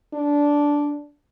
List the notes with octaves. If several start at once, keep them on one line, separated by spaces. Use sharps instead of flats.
D4